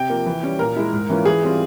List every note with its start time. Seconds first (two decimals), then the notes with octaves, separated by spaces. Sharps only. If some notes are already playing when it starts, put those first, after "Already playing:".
Already playing: C3 G5
0.09 F3 A#3
0.26 E3
0.43 G3 C#4
0.59 A#2 A#4
0.76 G#3 E4
0.93 G#2
1.09 E3 A#3 C#4 F4
1.25 E3 G#4
1.43 G3 C4 F4